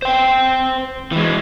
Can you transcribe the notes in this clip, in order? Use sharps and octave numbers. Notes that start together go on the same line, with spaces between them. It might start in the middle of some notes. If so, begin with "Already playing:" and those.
C5 G5
E3 G#3